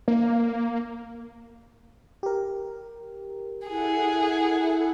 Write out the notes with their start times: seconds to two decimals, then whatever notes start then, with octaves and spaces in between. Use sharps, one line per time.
0.08 A#3
2.23 G4 A#4
3.68 E4 G#4 A4 F#5